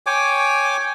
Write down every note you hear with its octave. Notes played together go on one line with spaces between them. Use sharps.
C#5 G5 G#5 D6